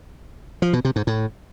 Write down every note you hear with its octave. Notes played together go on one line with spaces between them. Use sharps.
F3
B2
C3
G#2
A2